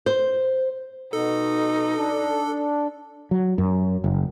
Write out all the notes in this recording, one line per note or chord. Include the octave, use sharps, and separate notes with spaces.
C5
B2 D#4 A4
D4
F#3
F#2
F#1